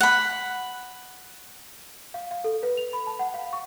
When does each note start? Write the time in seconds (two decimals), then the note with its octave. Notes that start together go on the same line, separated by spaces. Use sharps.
0.01 F#5 B5
2.14 F5
2.31 F5
2.44 A4
2.63 B4
2.77 F7
2.93 B5
3.07 A5
3.19 F#5
3.34 F5
3.53 C#6